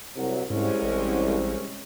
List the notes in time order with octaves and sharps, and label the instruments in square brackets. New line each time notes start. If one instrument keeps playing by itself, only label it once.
[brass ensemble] C2 F#3
[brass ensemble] C2 [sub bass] G#2 [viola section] G#3 C4 C#4
[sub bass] A1